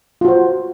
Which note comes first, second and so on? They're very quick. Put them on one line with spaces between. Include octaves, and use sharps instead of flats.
F4 F#4 C5